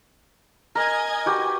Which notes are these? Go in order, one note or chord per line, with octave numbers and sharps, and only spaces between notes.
A#4 D#5 G#5 G#6
F#4 G4 B4